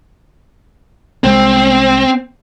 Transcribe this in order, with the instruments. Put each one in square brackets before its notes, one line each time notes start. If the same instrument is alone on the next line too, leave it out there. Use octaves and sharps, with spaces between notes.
[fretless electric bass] C2 G#3 [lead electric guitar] C4